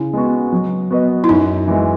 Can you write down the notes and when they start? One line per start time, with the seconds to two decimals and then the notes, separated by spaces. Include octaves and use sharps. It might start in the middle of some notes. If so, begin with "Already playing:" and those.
Already playing: C#3 E4
0.13 G#3 B3 F#4
0.52 F#3
0.90 B3 F#4 B4 D#5
1.24 E4
1.29 F#2 D#4
1.68 E3 G#3